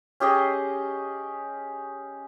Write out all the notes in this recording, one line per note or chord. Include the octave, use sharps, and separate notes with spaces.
C#4 G4 G#4 D#5